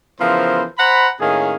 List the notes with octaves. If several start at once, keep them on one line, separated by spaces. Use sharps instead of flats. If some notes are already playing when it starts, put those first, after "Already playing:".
C#3 E3 F3 B3 A#4 C5
C5 F#5 A#5 B5
A2 D#3 A#3 C#4 G#4